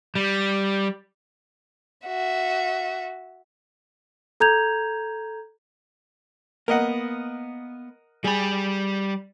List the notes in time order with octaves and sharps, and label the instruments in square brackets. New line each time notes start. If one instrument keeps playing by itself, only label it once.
[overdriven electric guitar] G3
[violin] F#4 E5
[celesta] A4 A#5 G6 G#6 F7
[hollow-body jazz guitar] A#3 B3 [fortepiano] A#4 D#5 F#5
[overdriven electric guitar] G3 B5 [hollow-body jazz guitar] G#4